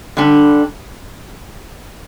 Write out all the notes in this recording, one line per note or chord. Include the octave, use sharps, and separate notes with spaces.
D3 G3 D4